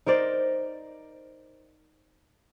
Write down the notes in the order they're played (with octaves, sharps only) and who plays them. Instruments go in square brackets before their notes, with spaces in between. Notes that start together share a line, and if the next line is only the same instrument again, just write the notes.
[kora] D#4 A#4 C5 D5